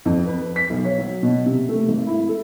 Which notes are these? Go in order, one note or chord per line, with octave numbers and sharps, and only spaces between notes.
F2
B4
B6
B1
C#5
F#3
B2
C3
A3
G#1
E4
A4